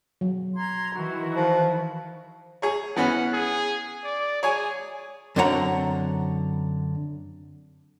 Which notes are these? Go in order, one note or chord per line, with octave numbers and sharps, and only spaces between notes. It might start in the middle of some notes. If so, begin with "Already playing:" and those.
F#3
A#5 C6 G#6
D#3 E3 E4 F#4
F3
G#4 C#5
E3 B3 C#4 F#5
G#4
D5
G#4 C#5 G#5
F#2 D3 C4 C#5 F#5 A#5